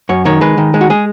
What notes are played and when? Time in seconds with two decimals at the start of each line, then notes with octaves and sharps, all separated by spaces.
0.09 F#2 C#5
0.25 D#3 C#5
0.41 G#3 B4
0.58 D#3
0.74 G#3
0.81 F#4
0.90 G#3 G#4